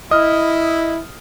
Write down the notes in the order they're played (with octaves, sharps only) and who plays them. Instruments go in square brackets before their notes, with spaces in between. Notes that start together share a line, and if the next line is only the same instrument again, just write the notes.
[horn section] E4 [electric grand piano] D#5 [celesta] D#6 F6